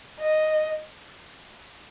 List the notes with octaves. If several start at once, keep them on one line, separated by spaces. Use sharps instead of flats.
D#5